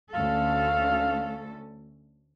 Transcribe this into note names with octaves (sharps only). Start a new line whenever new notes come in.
D2 C#4 A4 F5